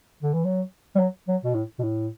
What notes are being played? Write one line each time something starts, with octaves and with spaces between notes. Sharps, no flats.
D3
E3
F#3
G3
F#3
F#3
B2
A2
B2
A2